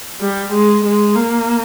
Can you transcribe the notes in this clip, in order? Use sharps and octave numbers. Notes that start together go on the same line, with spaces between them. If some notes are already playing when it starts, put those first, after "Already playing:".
G3
G#3
G#3
A#3